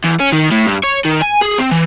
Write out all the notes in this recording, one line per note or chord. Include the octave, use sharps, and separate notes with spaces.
E2
C#4
D#3
A2
G2
C#5
D#3
G#5
G#4
C4
E3